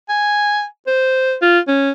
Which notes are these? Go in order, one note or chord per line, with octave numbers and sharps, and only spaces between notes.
G#5
C5
F4
C#4